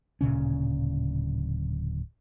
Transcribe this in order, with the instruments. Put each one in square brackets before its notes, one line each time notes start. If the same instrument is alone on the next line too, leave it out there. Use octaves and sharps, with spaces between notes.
[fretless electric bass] D1 A#2 C#3 C#4